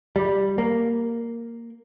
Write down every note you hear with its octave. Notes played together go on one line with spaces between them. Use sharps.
G3
A#3